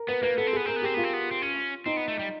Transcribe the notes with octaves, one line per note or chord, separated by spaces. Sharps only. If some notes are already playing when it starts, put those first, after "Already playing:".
Already playing: A#4
B3 B4
A#3 B4
B3 A4
C4
B3 G#4
C4 A#4
B3
C4 G4
B3 F4
C4
B3
C4
C#4
C4 D#4
B3
A3
G3